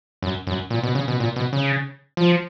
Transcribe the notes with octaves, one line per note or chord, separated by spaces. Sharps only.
F#2
F#2
A#2
B2
C#3
B2
A#2
B2
C#3
F3